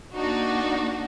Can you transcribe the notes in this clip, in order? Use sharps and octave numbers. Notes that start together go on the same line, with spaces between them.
A#3 D4 D#4 F#4